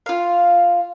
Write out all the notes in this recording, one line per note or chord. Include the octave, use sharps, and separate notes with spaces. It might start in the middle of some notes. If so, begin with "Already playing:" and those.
F4 F5